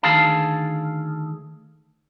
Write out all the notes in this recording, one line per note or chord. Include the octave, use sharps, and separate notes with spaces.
D2 D#3 G#4 A4 F5 A5